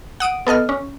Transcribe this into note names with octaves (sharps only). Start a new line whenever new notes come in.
F#5 D#6 D7 D#7
B3 A4 D#5 F6
C#4